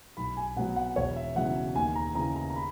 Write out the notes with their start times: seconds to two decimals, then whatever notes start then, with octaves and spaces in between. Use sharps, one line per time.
0.17 B1 B5
0.37 G#5
0.57 B2 F#3 F#5
0.76 F#5
0.96 E1 C#5
1.16 E5
1.36 E2 C#3 F#3 F#5
1.75 D#2 G#5
1.95 A#5
2.15 C#3 E3 A#5
2.36 A#5
2.50 A#5
2.56 B5